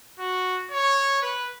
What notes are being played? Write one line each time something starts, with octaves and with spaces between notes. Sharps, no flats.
F#4
C#5
B4